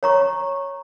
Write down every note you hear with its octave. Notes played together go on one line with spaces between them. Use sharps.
C#5 A#5 C#6